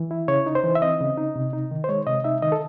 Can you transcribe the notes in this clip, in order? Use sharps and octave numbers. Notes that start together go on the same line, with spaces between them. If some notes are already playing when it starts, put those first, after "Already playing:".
Already playing: E3
E4
C#3 C#5
D#4
C5
E3
E5
C4 D#5
C#3
D#4
C3
D#4
D#3
C5
G#3 C#5
C3 D#5
D#4 E5
D#3 D#5
A4